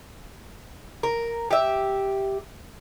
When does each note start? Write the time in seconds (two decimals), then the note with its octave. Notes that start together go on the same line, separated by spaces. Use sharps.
1.03 A#4
1.51 G4 E5